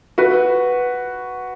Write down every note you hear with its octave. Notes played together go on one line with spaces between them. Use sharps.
F#4 B4